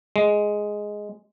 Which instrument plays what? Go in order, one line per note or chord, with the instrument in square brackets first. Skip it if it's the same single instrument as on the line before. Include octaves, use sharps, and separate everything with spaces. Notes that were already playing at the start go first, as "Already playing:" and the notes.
[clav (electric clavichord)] G#3